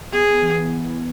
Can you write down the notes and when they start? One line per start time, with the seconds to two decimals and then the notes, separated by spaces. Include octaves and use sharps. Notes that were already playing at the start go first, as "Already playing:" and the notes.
0.13 B3 G#4
0.42 E3